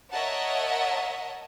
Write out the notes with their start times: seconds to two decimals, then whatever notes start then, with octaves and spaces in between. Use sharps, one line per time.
0.11 A#4 C#5 D#5 E5 F#5 A5